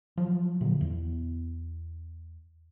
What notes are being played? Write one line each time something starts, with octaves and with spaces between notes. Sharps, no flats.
F3 F#3
A#2 D3
E2